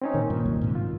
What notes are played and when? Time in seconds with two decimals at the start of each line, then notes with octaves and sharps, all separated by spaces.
0.02 C4 C#4 D#4
0.14 A#2 D#3
0.30 G2 A#2
0.45 C2 F#2 F#3
0.61 G#2 C3
0.75 F4